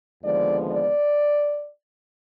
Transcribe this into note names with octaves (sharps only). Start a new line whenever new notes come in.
D#2 D3 F3 G#3 B3 D5
D5